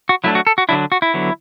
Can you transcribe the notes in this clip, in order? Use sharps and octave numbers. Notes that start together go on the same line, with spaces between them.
F#4
F#3 A3 D4 E4
F#4
A4
F#4
D3 F#3 D4 E4
F#4
E4
D3 F#3 B3